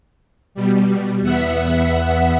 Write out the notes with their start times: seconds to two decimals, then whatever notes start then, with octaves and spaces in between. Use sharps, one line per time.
0.55 B2 G3
1.21 E2 B3 E5 F#5 B6